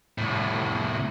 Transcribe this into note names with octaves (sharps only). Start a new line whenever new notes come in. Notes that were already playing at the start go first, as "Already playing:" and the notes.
C2 A2